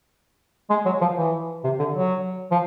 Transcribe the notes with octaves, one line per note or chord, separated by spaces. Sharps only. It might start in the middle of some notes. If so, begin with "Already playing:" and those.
G#3
F#3
F3
E3
C3
D3
F#3
F3